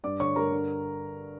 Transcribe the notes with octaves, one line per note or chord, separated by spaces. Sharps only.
G2 D5 D6
D3 C#5 C#6
G2 A#4 A#5
D3